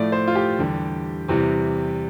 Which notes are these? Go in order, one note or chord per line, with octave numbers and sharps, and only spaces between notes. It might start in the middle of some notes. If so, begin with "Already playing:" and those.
Already playing: A2 F3 A3 D5
C5
F4
G4
E2 D3 G3
E2 C3 E3 G3